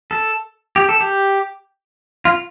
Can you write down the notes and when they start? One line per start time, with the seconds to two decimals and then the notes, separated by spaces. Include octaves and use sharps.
0.11 A4
0.76 G4
0.89 A4
1.01 G4
2.25 F4